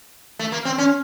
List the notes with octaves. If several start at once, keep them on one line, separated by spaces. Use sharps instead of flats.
A3
A#3
C4
C#4